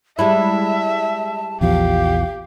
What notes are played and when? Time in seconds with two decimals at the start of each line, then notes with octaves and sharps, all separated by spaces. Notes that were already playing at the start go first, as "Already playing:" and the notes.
0.19 G3 G#3 E4 E5 A5
1.61 A#1 E2 F3 G4 F5